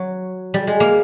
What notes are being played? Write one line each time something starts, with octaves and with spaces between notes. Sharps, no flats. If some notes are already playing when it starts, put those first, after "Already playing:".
Already playing: F#3
G3
G#3
A#3